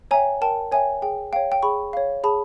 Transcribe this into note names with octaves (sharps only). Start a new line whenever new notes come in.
C#5 E5 G5 G#5 A#5
A#4 G5 A5
C#5 E5 G5 G#5
G#4 G5
C#5 F5 G5
G5
G#4 B5 C#6
C#5 F5
G#4 A5 B5